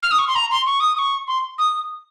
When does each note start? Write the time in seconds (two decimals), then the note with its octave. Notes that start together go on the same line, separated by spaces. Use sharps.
0.03 F6
0.11 D#6
0.19 C#6
0.28 C6
0.35 A#5
0.51 C6
0.66 C#6
0.80 D#6
0.94 D#6
0.99 C#6
1.28 C6
1.58 D#6